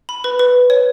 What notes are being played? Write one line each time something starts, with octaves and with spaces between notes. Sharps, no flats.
B5
B4
B4
C#5